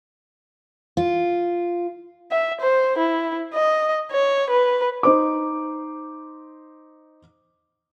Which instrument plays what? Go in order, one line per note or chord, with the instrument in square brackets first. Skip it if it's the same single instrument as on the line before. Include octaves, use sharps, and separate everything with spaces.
[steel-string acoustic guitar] F4
[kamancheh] E5
C5
E4
D#5
C#5
B4
[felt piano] D#4 C5 D6